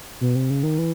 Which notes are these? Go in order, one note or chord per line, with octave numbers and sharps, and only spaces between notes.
B2
C3
C#3
D#3
E3